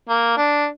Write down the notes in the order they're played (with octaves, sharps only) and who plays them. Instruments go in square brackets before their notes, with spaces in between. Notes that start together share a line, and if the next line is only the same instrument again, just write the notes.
[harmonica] A#3
D4